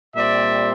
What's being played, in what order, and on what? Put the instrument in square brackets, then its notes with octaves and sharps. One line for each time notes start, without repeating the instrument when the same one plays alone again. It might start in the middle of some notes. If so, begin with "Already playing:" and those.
[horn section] A#2 G3 C4 D5 E5